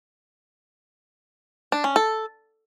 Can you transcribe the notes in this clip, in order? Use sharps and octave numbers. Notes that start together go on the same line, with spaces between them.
D4
C#4
A4